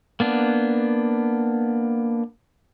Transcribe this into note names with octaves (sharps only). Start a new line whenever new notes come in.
A#3 B3 D4